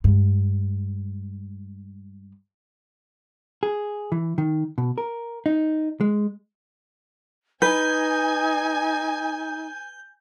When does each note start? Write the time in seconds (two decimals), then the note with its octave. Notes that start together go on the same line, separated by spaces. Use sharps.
0.04 G2 G#3
3.63 G#4
4.12 E3
4.38 D#3
4.78 B2
4.98 A#4
5.46 D#4
6.01 G#3
7.62 D#4 B4 G#5 G6